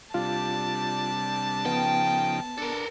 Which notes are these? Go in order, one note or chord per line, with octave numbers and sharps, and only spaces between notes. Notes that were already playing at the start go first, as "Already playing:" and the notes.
C3 G3 D4 F4 A5
C#3 F3 B3 D#4 G5
D4 A4 A#4